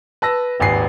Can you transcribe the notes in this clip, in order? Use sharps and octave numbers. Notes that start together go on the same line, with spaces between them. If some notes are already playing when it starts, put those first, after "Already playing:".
B4 A5 E6 A#6
D#1 G#1 B4 G#5 C7